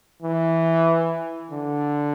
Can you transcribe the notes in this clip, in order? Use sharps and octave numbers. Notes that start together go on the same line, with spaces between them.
E3
D3